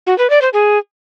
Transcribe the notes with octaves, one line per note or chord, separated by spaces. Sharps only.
F#4
B4
D5
C5
G#4